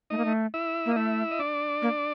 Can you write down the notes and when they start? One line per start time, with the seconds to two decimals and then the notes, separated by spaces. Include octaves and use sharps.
0.10 A3 D#4 D#5
0.18 A#3
0.25 A3
0.54 E4 E5
0.86 A#3
0.91 D#5
0.96 A3 E4 E5
1.31 D#5
1.39 D4 D5
1.82 A#3